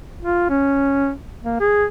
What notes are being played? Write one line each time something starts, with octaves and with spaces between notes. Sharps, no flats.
F4
C#4
A#3
G#4